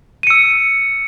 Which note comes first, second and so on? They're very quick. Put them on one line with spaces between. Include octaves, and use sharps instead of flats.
D#7 C#7 E6